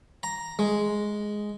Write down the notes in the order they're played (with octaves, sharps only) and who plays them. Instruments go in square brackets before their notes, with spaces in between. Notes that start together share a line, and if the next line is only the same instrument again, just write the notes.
[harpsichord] A#5
G#3